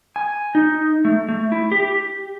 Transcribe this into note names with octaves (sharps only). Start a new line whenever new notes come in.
G#5
D#4
A3
A3
E4
G4